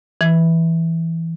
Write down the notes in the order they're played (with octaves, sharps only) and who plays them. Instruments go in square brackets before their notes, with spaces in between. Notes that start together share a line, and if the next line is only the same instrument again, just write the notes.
[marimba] E3